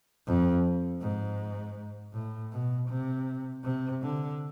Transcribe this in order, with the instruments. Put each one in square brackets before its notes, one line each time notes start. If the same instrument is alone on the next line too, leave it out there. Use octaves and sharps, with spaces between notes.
[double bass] F2
G#2
A2
B2
C3
C3
D3